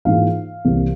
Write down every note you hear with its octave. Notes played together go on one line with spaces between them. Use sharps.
G#2 E3 A#3 F4 F5
C2 C3 E3 A#3